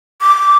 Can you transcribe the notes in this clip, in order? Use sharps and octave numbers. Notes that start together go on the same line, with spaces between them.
D6